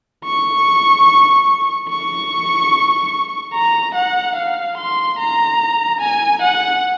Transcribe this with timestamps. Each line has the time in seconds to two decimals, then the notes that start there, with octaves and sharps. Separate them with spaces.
0.25 C#6
1.90 C#6
3.53 A#5
3.95 F#5
4.36 F5
4.78 C6
5.19 A#5
6.01 G#5
6.42 F#5